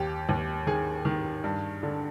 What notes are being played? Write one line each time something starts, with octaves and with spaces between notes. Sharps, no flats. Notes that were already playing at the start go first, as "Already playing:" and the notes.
Already playing: D#2 G4
D#2
D#3 G#4
D#3
G2
D3